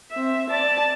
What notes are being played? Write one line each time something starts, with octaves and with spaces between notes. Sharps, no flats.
C4 E5
D5 A5